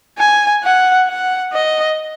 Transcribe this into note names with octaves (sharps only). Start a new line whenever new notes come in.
G#5
F#5
F#5
D#5